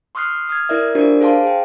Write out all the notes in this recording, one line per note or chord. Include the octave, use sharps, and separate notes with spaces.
C6 C#6 D#6 F6 F#6 C7
D#6 F6 G#6
E4 A#4 D5 E5
D4 F4 G4 A#4 C5 D5
G#4 C5 F5 A5 C6
G#4 G5